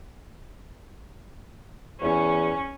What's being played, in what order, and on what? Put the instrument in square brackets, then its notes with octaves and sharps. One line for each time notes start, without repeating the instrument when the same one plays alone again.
[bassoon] E2 [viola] C#4